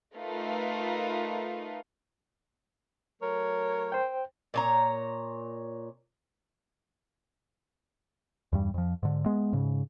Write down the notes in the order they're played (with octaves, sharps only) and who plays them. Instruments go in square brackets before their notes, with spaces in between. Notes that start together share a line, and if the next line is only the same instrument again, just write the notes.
[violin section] A3 D#4 F4 A#4 B4
[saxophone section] F#3 A3 C#5 [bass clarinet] A#4
[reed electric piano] C5 G5
[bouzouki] A#2 C#5 A#5
[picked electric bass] E2 G2 G3
F2 F3
G#2 D3
G#3 B3
G#2 C#3